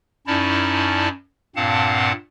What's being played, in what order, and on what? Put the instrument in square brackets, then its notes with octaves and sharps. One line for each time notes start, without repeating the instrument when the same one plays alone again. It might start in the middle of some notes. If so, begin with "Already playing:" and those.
[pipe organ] F#2 C#4 D#4 E4 D5 A5
G2 A#2 C4 F5 F#5 A5